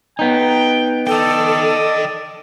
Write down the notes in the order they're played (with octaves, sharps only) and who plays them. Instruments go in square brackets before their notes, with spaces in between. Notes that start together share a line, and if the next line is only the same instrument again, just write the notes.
[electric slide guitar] B3 D#4 [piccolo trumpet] G5
[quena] A4 [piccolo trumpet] D5 [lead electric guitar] D#5 G5